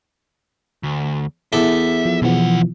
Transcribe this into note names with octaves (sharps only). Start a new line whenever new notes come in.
D2
E2 A4 E5 D6
F3
D#2 B2 E3 F3 F#5